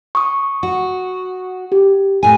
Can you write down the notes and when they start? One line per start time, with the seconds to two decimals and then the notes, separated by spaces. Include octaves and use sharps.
0.15 C#6 D#6
0.63 F#4
1.72 G4
2.23 A2 G#5